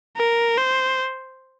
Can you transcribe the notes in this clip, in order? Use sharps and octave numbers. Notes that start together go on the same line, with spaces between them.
A#4
C5